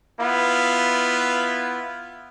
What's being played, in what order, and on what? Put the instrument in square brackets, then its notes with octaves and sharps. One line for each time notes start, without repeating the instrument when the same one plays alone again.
[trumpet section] B3 E4 F4